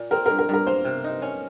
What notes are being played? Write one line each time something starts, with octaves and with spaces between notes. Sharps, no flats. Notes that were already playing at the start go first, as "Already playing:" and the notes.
Already playing: A#2 A#3
C4 A#4
G2 A#4
A#4
G2 A#4
A#3 C5
C3
D#4
C#4